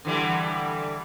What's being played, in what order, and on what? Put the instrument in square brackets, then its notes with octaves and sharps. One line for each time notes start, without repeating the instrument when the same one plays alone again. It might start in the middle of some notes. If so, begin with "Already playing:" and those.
[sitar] D3 E3 G3